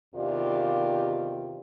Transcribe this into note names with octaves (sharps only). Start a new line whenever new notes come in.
E2 C3 D#3 F4 G4 D5